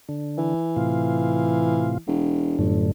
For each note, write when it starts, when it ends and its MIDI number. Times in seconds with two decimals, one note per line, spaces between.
0.09 0.54 50
0.37 1.99 52
0.76 1.98 45
0.76 1.98 48
0.76 1.98 65
2.06 2.58 28
2.59 2.85 31
2.59 2.91 42
2.59 2.91 45
2.59 2.91 50